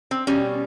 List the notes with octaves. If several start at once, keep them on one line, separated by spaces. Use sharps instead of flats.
C4
B2 G3 C#4